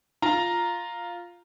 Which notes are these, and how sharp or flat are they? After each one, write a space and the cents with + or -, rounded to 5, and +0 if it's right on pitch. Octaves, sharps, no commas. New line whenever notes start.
F4 +0 A#5 +0